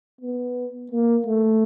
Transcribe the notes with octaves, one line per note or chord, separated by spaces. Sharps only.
B3
A#3
A3